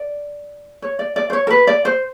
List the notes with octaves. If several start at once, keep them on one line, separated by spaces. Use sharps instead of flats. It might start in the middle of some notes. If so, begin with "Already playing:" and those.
Already playing: D5
C#5
D5
D5
C5
C#5
A#4
B4
D5
C5